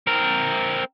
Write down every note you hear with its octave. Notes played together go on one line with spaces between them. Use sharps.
C4 A#4